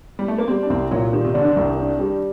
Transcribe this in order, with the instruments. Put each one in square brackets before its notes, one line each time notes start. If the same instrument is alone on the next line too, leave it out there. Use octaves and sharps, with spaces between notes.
[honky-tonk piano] G3
A3
A#3
[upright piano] G3 [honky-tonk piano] C4
[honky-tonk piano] D4
[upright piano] C2 [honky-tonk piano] C4
[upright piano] A#2 [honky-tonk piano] F#3
[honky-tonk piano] D#3 [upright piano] G3
[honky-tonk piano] C3
[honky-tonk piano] D3 [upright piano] D4
[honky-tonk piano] D#3
[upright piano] C2
D4
G3